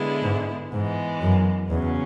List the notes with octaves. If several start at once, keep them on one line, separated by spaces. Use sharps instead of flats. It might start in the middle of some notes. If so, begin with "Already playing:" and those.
Already playing: D3 G#3 B3 E4
G#2
G#2 E3 G#3 B3
F#2
E2 C#3 F#3 C#4